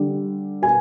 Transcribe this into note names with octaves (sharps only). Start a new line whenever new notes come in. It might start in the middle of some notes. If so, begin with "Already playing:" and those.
Already playing: D3 G3
B2 G#5